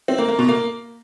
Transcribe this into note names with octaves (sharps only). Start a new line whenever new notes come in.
C4
A#3
A#3
B2
A#3